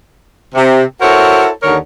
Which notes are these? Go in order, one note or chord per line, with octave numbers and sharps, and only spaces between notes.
C3
E4 F#4 A4 A#4 C5 C#5
D#2 D3 D#4 A#4 C#5